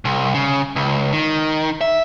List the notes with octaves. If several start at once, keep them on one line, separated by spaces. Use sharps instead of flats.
C2
C#3
C#2
D#3
E5